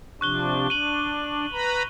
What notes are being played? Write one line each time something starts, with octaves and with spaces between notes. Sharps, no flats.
C3 F3 D4 C#6 F#6 G7
D4 D#7 F#7
B4 A#5 B5